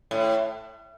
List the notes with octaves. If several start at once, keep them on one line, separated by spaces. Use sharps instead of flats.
A2